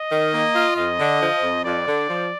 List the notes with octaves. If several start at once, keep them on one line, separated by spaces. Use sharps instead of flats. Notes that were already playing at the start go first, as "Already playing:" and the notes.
Already playing: D#5
D#3
A#3
F4
F2 D#5
D3
F3
F2
F2 D5
D3
F3